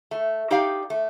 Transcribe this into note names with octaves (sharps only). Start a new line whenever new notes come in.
A3
D#4 G4 D5 F5
A3